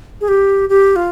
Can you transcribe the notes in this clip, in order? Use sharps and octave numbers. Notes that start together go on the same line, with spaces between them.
G#4
G4
G4
F4